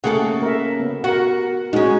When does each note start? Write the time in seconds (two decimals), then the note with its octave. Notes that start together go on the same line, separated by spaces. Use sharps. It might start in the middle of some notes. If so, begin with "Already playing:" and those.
0.04 C#3 A3 A#3 G#4 A4 F#5
0.42 A#4 E5
0.80 B3
1.04 F#4 A#4 F#5
1.73 G#3 C#4 D#4 F#4 G#4